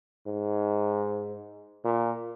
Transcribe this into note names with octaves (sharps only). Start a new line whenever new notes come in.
G#2
A#2